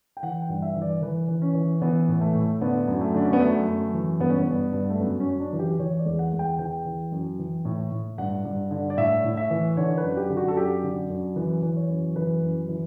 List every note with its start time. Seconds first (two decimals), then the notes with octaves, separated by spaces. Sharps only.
0.17 G5
0.23 E3 F#5
0.42 G5
0.49 G2
0.62 E5
0.75 E3
0.82 D5
1.02 E3 B4
1.28 E3
1.42 C#4
1.54 E3
1.81 E3 B3
2.08 A2
2.21 A3
2.35 A2
2.61 D3 B3
2.88 F#2
3.01 A3
3.14 D3 D4
3.25 C#4
3.33 B3
3.40 F#2 A3
3.67 F#2
3.94 E3
4.20 G2 B3
4.30 C#4
4.38 B3
4.47 G2
4.73 G2
4.90 A3
5.00 F#2 B3
5.20 C#4
5.27 F#2
5.40 D4
5.53 E3
5.59 G4
5.79 E3 C#5
5.99 D5
6.06 E2
6.19 F#5
6.33 E2
6.39 G5
6.59 E3 G5
6.85 E3
7.12 F#2
7.39 E3
7.65 A2
7.92 A2
8.18 G2 F#5
8.45 G2
8.71 D3
8.90 D5
8.97 A2 E5
9.24 A2
9.37 E5
9.50 E3
9.77 D3 C#5
9.98 B4
10.03 F#2
10.17 G4
10.30 D3
10.37 F#4
10.48 A4
10.56 F#2 G4
10.83 D3
11.10 F#2
11.36 E3 B4
11.63 E3
11.76 C#5
11.90 F#2
12.16 E3 B4
12.42 F#2
12.69 E3